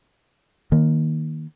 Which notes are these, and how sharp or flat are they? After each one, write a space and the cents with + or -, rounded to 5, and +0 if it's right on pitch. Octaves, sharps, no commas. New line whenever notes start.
D#3 +0 A#3 +0